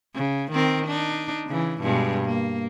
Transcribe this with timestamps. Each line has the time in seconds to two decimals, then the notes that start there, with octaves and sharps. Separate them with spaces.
0.15 C#3
0.52 D#3 C4 A#4
0.87 D4 D#4
1.47 C#3 E3
1.82 G2 B2 G#3
2.26 A#3